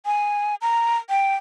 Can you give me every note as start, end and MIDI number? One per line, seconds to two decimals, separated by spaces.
0.06 0.55 80
0.62 0.97 82
1.09 1.35 79